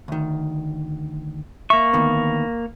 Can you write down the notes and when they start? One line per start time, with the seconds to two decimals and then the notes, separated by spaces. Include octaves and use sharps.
0.08 D2 D#3
1.70 A#3 E5 C#6
1.93 D2 D#3 B3